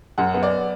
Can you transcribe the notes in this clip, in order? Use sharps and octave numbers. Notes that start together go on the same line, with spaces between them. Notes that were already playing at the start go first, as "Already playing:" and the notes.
F#2 F#5
B3
D5